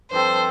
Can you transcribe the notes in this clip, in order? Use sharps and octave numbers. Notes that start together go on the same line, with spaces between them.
G2 F3 C4 A4 C5